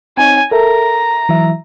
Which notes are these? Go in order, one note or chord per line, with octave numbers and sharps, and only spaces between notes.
C4 D#4 C#5 G#5
A4 A#4 E5 A#5
E3 F#3 E5